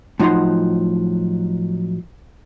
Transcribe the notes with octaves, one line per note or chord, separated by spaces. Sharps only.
A2 F3 F#3 D#4 F#5 C6